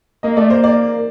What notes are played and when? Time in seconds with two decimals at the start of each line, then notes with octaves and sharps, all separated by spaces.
0.23 A#3 D#5
0.37 A3 D5
0.49 A#3 C5
0.64 D5